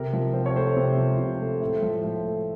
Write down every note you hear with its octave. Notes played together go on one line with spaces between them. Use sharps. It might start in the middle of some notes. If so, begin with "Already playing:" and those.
Already playing: C3 A#4
F3
C3 C5
C#5
A3 C5
C3
F3
C3
A3
A2
F3
A2
A3